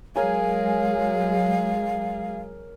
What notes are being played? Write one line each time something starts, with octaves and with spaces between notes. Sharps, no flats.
F#3 G#3 G#4 A#4 C#5 F5 G#5